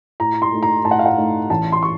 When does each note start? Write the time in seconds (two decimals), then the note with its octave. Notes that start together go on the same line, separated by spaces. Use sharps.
0.20 A2 A#5
0.42 C6
0.52 A3 D#4
0.63 A#5
0.84 A2 A5
0.91 F#5
0.99 F5
1.06 F#5
1.18 A3 D#4
1.50 A1 A5
1.72 C6
1.83 C#6